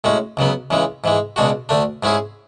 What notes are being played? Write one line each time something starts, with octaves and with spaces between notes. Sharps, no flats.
A2 G#3 C#4 F#4
C#2 C#3 F#3 B3
C#2 C#3 E3 G#3
G#2 E3 G#3
C#2 B2 G#3 D4 F#4
D2 D3 A3 D4
G#2 G#3 C#4 E4 G#4